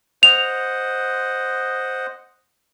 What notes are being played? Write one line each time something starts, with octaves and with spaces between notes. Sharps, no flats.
C5 D#5 F#5 F7